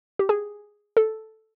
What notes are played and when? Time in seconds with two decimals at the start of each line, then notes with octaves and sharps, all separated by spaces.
0.19 G4
0.29 G#4
0.97 A4